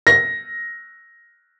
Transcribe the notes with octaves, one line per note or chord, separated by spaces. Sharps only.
A#6